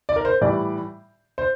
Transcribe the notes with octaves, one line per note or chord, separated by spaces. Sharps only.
D5
A#4
C5
A2 E3 G3 D5
C5